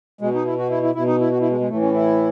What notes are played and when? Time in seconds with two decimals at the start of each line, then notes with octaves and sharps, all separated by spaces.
0.21 B2 G#3
0.34 D#4
0.46 E4
0.59 F#4
0.70 E4
0.83 E4
0.95 B2 E4
1.07 D#4
1.20 E4
1.32 F#4
1.41 E4
1.50 G#3
1.60 G#3
1.69 A2 A3
1.73 E3
1.82 C#4
1.94 E4